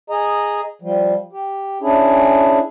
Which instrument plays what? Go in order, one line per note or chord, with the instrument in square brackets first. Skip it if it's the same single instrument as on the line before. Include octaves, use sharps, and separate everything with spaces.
[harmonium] G#4 D#5 A#5
F3 G3
G4
C#4 D4 E4 G#4